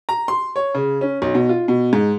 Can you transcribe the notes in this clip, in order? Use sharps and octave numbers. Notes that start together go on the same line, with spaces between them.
A#5
C6
C#5
C#3
C#4
B1
B2
F4
B2
G#2